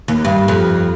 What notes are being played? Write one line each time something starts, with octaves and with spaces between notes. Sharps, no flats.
D#2
G2
F2